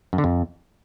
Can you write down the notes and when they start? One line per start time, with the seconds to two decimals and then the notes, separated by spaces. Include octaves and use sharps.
0.13 F#2
0.18 D3
0.24 F2